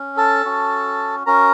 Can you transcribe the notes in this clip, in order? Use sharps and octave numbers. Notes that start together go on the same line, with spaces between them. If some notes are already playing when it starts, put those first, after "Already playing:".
Already playing: C#4
A4 A5
C#4 F#4
C#4 F#4 A#4 A#5